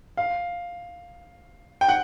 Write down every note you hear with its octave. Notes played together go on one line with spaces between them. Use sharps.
F5
G5
F#5